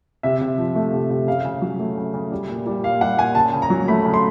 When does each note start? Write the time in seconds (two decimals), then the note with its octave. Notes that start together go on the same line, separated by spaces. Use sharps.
0.23 C3 E5
0.41 C3
0.58 F3
0.75 A3
0.93 C3
1.10 C3
1.27 C#3 F5
1.45 C#3
1.62 F#3
1.79 A3
1.97 C#3
2.14 C#3
2.31 G3
2.49 A#2
2.67 G3
2.83 A#2 F5
3.01 G3 F#5
3.18 A#2 G#5
3.35 C#3 A5
3.53 C#3
3.62 A#5
3.70 F#3
3.88 A3 B5
4.05 C#3
4.14 C6